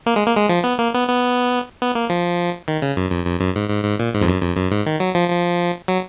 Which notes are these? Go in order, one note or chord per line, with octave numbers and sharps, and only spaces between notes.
A#3
G#3
A#3
G#3
F3
B3
A#3
B3
B3
B3
A#3
F3
D#3
C#3
F#2
F2
F2
F#2
G#2
G#2
G#2
A#2
G#2
F2
F#2
F2
F#2
G#2
D#3
F#3
F3
F3
F#3